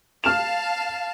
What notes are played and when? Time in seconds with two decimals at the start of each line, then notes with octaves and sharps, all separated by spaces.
0.24 F5 A5 F6 E7 F7